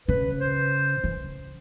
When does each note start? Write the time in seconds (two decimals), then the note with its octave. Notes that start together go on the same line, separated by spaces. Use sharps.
0.08 C#3 B4
0.40 C5
1.04 E3